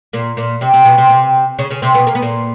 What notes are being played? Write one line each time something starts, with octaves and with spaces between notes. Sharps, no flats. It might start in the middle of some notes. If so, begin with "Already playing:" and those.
A#2 A#3
A#2 A#3
C3 C4
C3 C4
B2 B3
C3 C4
C3 C4
C#3 C#4
C#3 C#4
C3 C4
B2 B3
A#3
B3
A#2 A#3